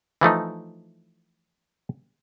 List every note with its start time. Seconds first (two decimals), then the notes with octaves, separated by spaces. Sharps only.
0.21 E3 F3 A3 D#4